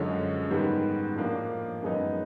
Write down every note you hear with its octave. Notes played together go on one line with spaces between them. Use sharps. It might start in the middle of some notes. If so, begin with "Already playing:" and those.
Already playing: F#2 D3 F3 G#3 C#4
G#2 D#3 G3 B3
A2 F3 A#3 D4
F#2 D#3 G#3 B3 D#4